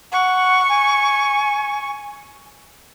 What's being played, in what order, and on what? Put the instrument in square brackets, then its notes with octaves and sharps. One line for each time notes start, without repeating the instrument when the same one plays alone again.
[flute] F#5 [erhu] C#6
[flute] G#5